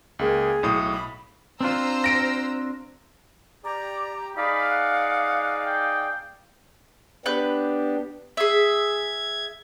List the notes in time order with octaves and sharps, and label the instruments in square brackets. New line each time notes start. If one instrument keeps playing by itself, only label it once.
[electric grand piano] C#2 A#3 [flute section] G#4
[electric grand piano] B1 A2 D#6
[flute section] B5
[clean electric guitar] C4 D4 F4 [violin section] C5 A#5 E6
[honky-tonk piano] A#6 D7
[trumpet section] G4 [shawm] D5 [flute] A#5
[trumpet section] D#4 G#4 D5 [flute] F5 [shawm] B5
[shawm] F#5
G5
[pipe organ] B3 D4 G4 [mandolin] B4 G6
[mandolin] G#4 E5 [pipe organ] G#6